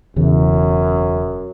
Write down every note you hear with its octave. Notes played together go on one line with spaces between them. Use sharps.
E1 F#2 C#3 E3